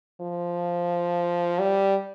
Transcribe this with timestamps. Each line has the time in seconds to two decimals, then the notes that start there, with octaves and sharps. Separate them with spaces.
0.21 F3
1.59 G3